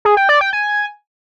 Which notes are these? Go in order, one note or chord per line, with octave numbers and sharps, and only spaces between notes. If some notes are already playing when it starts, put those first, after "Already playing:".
G#4
G5
D5
G5
G#5